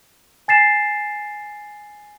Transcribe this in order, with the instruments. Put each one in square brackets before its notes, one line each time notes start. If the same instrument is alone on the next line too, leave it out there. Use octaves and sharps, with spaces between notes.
[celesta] G#5 A6 C7 E7